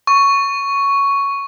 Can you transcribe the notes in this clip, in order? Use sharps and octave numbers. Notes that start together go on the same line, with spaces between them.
C#6